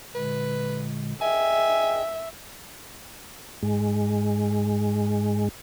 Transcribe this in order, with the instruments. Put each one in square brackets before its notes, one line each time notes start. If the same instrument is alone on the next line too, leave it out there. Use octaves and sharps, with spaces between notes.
[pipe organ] A#2 D3 G#3 [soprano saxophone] B4
[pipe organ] G#4 D#5 G5 [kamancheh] E5 [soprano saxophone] G#5
[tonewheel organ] G#2 G#3